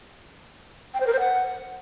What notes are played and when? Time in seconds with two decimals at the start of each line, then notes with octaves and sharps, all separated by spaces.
0.94 G5
1.00 C5
1.07 A#4
1.13 C5
1.19 F#5